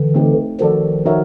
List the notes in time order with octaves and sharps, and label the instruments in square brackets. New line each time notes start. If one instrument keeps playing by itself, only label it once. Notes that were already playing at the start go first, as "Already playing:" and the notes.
Already playing: [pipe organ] D3 E3
[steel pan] A3 C4 D#4 G4
[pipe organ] D#3 F3 [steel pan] F#4 A4 D5
[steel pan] D#4 F#4 A#4 C#5 E5